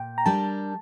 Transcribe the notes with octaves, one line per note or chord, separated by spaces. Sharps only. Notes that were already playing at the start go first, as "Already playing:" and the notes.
Already playing: A#2 G5
A#5
G3 D4 G4 A#4 A5